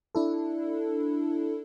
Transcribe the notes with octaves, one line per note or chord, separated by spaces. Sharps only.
D4 E4 A4